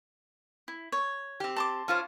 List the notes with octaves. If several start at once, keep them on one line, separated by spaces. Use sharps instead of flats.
E4
C#5
C4 G4
A5 C6 D6
C#4 F4 C5